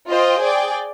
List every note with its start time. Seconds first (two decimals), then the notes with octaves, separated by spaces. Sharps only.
0.08 F4 C5 D#5 G5
0.41 G#4 D5 G5